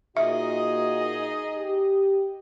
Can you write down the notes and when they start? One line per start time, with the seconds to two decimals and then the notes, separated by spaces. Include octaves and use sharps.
0.17 A#2 D#4 F#4 G#4 D#5 E5
1.56 G4